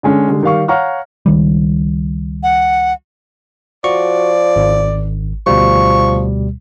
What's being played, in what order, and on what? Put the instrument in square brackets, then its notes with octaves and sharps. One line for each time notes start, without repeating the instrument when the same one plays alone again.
[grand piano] D3 G#3 C#4
D3 G3 G#3
D#3 G3 F5 C#6
C#5 F5 F#5 A#5 C#6 F6
[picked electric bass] C#2 D#3 G3
[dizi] F#5
[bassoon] F3 [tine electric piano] F#4 C#6 [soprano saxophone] D5
[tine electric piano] G#1
[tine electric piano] D2 B2 G3 [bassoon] F3 [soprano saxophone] C#6